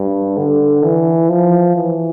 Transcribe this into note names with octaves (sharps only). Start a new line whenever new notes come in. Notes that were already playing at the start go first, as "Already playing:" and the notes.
Already playing: G2
D3
E3
F3
E3